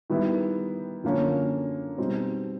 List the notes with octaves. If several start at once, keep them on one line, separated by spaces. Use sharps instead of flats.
D#3 G3 B3 E4
F#2 D3 F3 A#3 C#4
B2 G3 C4 D#4